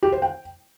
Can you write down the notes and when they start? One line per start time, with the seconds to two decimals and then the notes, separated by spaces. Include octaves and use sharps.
0.03 G4
0.12 C5
0.22 G5